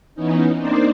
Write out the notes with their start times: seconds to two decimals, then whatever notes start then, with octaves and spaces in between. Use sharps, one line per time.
0.15 E3 B3 C#4 D#4
0.58 A#3 C4 D4 D#4 C5 D5